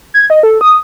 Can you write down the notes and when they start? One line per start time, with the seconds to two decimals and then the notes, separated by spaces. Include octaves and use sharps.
0.14 G#6
0.30 D#5
0.43 A4
0.61 D#6